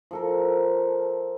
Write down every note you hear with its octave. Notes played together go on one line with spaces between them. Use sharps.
F3 A4 A#4